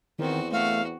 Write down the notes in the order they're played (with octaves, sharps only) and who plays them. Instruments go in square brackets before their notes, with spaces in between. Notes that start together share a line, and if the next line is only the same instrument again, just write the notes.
[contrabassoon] E2 [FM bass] D#3 [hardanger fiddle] C4 F#4
[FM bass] A3 [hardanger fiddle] F#4 [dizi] F5